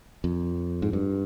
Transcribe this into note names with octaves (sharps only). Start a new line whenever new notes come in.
F2
G#2
G2